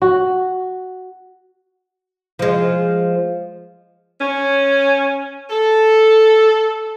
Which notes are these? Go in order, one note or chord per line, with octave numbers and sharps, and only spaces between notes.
F#4
F3 G#3
C#4
A4